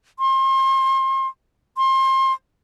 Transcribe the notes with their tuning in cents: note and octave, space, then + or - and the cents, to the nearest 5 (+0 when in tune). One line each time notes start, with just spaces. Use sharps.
C6 +35
C6 +30